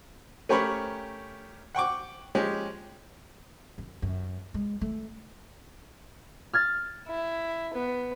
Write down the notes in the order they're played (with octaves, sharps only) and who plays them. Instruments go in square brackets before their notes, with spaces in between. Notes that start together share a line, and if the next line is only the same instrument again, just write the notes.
[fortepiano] A3 C#4 G4 A#4 B5 C#6
F#5 G5 C#6 D6
F3 G#3 C#4 G4
[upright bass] F#2
F#2
G#3
A3
[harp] F6 G#6 A6
[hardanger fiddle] E4
B3